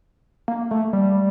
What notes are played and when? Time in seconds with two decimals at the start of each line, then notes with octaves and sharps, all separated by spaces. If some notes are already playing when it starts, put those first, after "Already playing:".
0.48 A#3
0.71 A3
0.93 G3